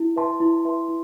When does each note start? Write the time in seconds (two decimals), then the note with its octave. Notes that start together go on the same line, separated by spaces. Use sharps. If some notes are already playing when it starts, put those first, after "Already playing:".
Already playing: E4
0.16 B4 E5 A5 C6
0.40 E4
0.65 B4 E5 A5 C6
0.88 E4